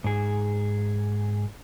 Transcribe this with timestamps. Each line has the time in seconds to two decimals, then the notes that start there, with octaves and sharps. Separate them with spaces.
0.04 G#2 G#4